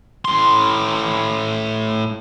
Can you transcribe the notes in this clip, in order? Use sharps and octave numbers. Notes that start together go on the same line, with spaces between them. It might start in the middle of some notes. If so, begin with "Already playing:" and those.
A2 C6